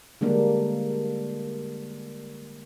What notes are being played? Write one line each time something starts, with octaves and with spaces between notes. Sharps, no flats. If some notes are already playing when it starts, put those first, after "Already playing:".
D3 G3 G#3 A#3 D4